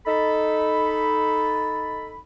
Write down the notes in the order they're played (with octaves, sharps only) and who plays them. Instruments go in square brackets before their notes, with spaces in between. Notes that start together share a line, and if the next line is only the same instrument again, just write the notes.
[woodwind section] D#4 A4 B5